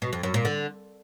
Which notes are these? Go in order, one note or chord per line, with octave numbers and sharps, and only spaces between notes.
B2
F2
F#2
A#2
D3